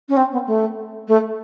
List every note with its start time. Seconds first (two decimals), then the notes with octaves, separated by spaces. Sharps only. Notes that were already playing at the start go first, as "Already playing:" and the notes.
0.08 C#4
0.16 C4
0.32 B3
0.46 A3
1.07 A3